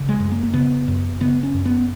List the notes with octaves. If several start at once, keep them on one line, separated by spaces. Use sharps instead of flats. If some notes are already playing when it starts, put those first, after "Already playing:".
Already playing: C#3
G#3
F#2
A#3
A#3
C#3 B3
F#2
C#3 B3
C#4
F#2
B3